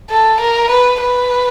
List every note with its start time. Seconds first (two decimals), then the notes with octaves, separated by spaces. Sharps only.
0.10 A4
0.40 A#4
0.70 B4
1.02 B4